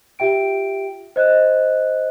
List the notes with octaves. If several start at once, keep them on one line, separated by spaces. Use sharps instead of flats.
F4 G4 E5 G5 D7
C5 D#5 F#6